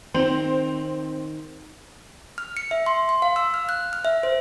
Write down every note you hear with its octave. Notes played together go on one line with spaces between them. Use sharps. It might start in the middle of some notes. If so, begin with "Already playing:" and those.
D#3 C4 C5
F6
C#7
E5
C6
C6
F5
E6
F6
F#6
F6
E5
C5